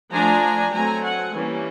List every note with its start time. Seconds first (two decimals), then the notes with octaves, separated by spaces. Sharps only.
0.12 F3 A3 D4 G#5 A#5
0.73 F#3 A3 C4 G#5 A#5
1.04 F#5 G#5
1.34 E3 G3 A#3 C#4